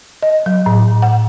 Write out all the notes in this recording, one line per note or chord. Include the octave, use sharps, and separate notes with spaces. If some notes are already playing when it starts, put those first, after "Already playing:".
D#5
F#3
A2
F#5